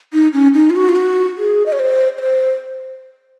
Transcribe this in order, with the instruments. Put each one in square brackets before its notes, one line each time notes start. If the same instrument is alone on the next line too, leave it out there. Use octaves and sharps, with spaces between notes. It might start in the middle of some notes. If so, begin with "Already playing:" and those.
[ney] D#4
C#4
D#4
F4
F#4
F4
F#4
G#4
D#5
C#5
C5
C#5
C5